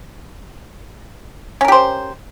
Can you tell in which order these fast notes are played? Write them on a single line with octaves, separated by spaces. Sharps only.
C#4 A#4 G4 C5